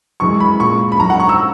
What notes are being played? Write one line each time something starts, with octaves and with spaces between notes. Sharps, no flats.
F#2 E3 G#3 C#6
B5
A#2 G#3 C#6
B5
F#2 D#3 F#3 A#5
F#5
C#6
E6